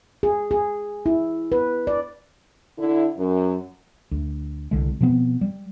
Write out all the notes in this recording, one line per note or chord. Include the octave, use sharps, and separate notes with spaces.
G#4
G#4
E4
B4
D5
D3 E4
F#2
D2
C2 D3 G#3
B2 F3 B3 C4
G3